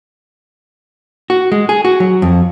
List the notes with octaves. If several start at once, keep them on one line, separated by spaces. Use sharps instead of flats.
F#4
G#3
G#4
F#4
F#3
F2